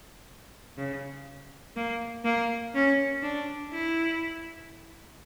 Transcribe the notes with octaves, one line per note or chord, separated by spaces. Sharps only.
C#3
A#3
A#3
C#4
D4
E4